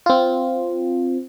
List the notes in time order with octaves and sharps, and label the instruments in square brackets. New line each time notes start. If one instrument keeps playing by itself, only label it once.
[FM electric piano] C4 F4